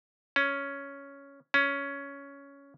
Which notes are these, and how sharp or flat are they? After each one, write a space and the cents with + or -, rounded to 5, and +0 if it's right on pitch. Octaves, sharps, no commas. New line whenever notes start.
C#4 +5
C#4 +10